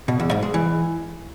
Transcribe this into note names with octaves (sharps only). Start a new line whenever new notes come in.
B2
E2
G#2
G#3
E3